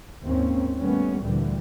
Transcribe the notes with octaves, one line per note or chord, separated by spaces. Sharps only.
D#2 G#2 A#3 C4 C#4
D#2 G3 A3 B3 C#4
D2 A#2 D3 E3 G3